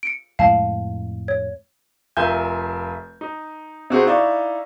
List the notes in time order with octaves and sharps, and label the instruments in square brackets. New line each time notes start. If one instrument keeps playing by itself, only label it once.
[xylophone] C#7 D7
[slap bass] F2 A2 G#3 [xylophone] F5 A5
[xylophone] C#5
[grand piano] F1 F4 A#4 E5 G#5 G6
D#4
C3 F#4 G#4 C5
D#4 E4 D5 F5 C#6